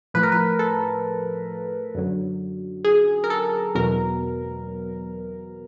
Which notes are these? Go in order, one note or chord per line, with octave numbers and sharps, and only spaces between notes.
A2 F3 B4
A#4
B4
A4
F#2 D3 F#3
G#4
A#4
A4
E2 B2 F#3 A#4